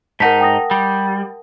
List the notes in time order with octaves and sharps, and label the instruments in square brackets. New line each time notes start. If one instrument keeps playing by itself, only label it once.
[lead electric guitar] G#2 D#4 [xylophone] A#4 F#5 A5 [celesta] B6
[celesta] G5 D#6 A#6
[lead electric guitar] G3